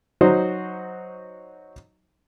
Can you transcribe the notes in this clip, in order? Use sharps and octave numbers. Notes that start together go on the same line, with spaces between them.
F#3 D#4 F#4 C5